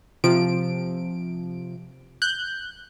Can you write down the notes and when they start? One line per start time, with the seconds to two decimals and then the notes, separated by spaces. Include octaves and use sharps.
0.24 C3 F3 D7
2.22 F#6 G6